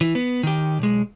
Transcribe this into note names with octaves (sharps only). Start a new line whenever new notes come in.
E3
B3
D#3 G4
B1 G#3